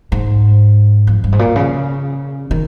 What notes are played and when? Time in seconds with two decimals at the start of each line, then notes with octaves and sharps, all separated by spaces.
0.12 G#2
1.07 F2
1.24 G2
1.32 G#2
1.39 A#2
1.56 C#3
2.51 D#3